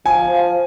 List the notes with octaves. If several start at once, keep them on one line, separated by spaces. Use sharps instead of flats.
F3 G#5
F3